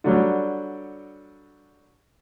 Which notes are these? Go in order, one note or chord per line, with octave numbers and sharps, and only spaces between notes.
D3 F#3 G3